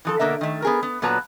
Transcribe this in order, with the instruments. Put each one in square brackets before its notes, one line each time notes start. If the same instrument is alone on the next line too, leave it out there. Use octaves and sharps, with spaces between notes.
[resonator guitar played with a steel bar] E3 F3 A4
B2 D3 A#3 A#4 E5
D#3 A3
B3 G#4 A#4
B3
A#2 F#3 B3 B4 A5 A#5